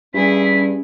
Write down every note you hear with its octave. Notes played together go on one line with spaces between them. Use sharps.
G2 C#4 E4 G#4 B6